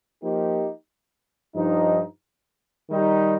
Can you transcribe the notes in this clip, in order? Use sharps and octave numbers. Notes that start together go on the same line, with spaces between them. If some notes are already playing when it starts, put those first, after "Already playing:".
F3 A#3 D#4 G4
G2 F3 D#4
D#3 G3 D#4 G4